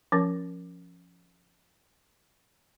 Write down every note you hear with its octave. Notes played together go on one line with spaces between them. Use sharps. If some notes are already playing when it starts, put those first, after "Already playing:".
F3 C#4 A#4